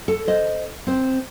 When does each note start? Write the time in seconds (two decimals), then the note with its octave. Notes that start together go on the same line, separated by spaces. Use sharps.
0.08 A4
0.27 C5 D#5
0.87 C4 C5